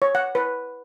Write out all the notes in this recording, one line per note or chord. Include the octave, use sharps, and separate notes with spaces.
C#5
F#5
B4